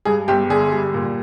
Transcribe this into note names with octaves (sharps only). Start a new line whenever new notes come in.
G2 G#4
G1 G4
D3 G#4
G3
A#2